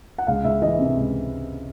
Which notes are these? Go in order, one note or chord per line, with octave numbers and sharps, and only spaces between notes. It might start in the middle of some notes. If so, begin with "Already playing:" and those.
F#5
C#2 F5
C#2 E5
E3 D#5
C3
C#2